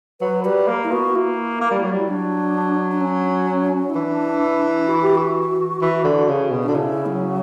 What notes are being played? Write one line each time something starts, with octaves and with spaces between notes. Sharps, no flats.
F#3 B4
G3 B4
A#3
E4
B3 F#4
A#3 E4
A#3
G3
F#3
G3 E4
F#3 D4
D4
C#4
E4
E3 D4
F#4
G4
F#4
E3
D3
C#3
B2
D4
D3
C#3 E4
F#3